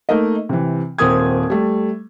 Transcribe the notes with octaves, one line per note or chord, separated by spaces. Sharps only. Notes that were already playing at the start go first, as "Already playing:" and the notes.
A3 A#3 D#4 A#4 D#5
C3 E3
D#1 C4 A#4 D#6 G#6
G3 A3